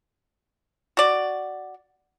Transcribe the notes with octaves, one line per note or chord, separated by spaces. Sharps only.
F#4 D5